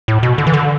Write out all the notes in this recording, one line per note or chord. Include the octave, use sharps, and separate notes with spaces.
A2
B2
D3
E3
D3